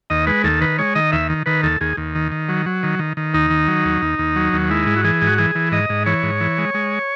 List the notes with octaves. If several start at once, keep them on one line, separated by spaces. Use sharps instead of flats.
D#2 D#5
G#3 B4
D#2 A4
D#3 B4
G#3 C#5
D#3 D#5
D#2 E5
D#3
D#3 B4
D#2 A4
D#2 G#4
D#2
D#3
D#3
F#3
F#3
D#3
D#3
D#3
D#2 D#4
D#3
F#3
D#2
D#2
D#2
F#3
D#2
G#3 E4
G#2
F#4
E3 G#4
G#2
F#4
E3 G#4
E3
G#2 D#5
G#2
E3 C#5
G#2
E3
G#3
G#3